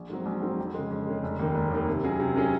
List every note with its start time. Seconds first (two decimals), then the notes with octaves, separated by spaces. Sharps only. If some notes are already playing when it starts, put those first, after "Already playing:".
Already playing: A#1
0.09 G#2 F#3 C4
0.26 A#1
0.42 G#2 F#3 C4
0.58 F2
0.74 C#3 G#3
0.90 F2
1.06 C#3 G#3
1.23 F1
1.39 D#2 D#3 A#3
1.55 F1
1.71 D#2 D#3 A#3
1.88 C3
2.04 F#3 C#4 G#4
2.20 C3
2.35 F#3 C#4 G#4